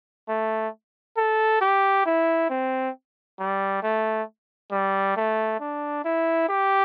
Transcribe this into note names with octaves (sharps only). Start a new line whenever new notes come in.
A3
A4
G4
E4
C4
G3
A3
G3
A3
D4
E4
G4